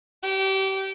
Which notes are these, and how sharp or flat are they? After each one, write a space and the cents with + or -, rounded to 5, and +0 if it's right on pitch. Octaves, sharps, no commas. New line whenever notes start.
G4 -30